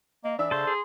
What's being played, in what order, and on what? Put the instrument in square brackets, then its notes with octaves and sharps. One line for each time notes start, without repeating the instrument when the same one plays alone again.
[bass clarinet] A#3 [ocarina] D#5
[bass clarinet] E3 [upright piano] D4 E5 [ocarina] E6
[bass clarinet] C#3 [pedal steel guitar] A4 C5 [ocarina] C6
[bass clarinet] G#4